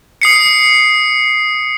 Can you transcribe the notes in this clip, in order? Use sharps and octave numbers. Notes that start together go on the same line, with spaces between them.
D#6 C7 C#7